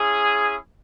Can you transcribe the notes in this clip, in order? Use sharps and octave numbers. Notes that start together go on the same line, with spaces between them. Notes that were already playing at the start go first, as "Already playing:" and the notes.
Already playing: C#4 E4 G#4